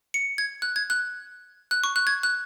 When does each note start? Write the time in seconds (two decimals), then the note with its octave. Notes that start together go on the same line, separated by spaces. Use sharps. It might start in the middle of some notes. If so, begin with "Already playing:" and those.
0.14 C#7
0.38 G#6
0.62 F#6
0.76 G#6
0.90 F#6
1.71 F#6
1.84 C#6
1.96 F#6
2.07 G#6
2.23 F#6